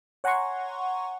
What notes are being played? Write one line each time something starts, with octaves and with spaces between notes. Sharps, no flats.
C#5 F#5 G#5 A#5 C6 C#6